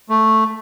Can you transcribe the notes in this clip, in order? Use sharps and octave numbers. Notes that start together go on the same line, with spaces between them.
A3